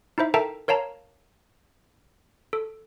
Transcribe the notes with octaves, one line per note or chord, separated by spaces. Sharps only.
D#4 E4 C5 E5
A4 A#4 E5 G5 A5 A#5
A#4 C#5 F5 A5 A#5
A4